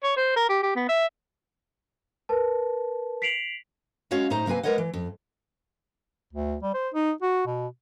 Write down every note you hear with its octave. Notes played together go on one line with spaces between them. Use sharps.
C#5
C5
A#4
G4
G4
B3
E5
A#4 B4 A5
B6 C7 D7 F7 F#7
G#3 C#4 F#4 C#5 F5
A2 D#4 C5 A#5
C3 A#3 C4 B4 G#5
G#3 A#4 B4 C#5 D#5 F#5
E3
F2
D2
G3
C5
D#4
F#4
B2